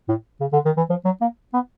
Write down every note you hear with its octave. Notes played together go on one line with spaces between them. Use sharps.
A2
C#3
D3
D#3
E3
F3
F#3
A#3
B3